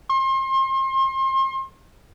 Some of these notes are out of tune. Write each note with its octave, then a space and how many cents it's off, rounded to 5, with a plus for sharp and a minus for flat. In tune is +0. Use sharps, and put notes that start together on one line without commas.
C6 +35